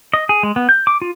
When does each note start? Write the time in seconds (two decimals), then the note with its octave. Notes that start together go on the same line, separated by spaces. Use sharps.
0.14 D#5
0.29 G#4
0.43 G#3
0.56 B3
0.69 G6
0.87 D6
1.02 F4